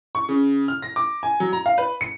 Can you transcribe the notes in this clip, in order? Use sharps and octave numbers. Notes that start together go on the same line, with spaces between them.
C#6
C#3
F6
A#6
D6
G#5
F#3
A#5
F5
B4
C#7